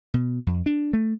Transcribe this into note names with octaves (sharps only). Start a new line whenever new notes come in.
B2
F2
D4
A3